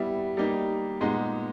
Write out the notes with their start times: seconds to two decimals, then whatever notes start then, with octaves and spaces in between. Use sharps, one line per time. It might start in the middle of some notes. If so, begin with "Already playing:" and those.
Already playing: G3 B3 E4
0.37 G3 A#3 D#4
1.01 A#2 G#3 B3 D#4